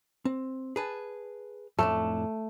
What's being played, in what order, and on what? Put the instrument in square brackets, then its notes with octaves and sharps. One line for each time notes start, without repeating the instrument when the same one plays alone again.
[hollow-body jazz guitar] C4
G#4 B4 A5
[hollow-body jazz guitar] F2 A2 D4 [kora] A3